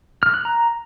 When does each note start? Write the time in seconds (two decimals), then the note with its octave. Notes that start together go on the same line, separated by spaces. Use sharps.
0.23 F6
0.34 F#6
0.45 A#5